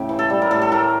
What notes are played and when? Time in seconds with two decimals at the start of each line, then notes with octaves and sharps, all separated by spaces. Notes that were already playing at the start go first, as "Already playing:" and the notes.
Already playing: A2 C#3 G4
0.09 E3
0.19 A4
0.30 G3
0.42 A#4
0.51 A2 A4
0.62 A4
0.72 A2 A#4